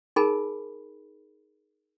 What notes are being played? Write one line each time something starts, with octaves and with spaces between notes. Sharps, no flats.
D#4 G#4 A#4 G#5 B5